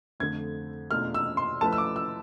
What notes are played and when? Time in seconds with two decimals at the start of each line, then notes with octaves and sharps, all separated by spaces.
0.20 F2 D3 A3 G#6
0.91 E2 B2 A3 D4 F4 F6
1.14 E6
1.37 C6
1.61 F3 A3 E4 B4 A5
1.73 E6
1.78 D6
1.96 E6